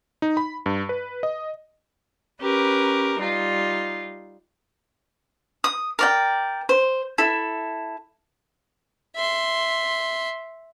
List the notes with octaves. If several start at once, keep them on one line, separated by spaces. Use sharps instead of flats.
D#4
B5
G2
B4
D#5
C#4 G4 A#4 B4
G3 D#4 F4
D#6
A#4 D5 G5
C5
E4 A4
E5 C6